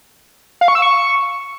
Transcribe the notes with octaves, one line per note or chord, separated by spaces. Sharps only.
F5
C#6
E6
C#6